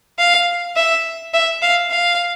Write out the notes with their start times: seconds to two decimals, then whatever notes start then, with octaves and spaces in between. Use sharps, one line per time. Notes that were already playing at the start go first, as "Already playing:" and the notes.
0.19 F5
0.76 E5
1.34 E5
1.62 F5
1.91 F5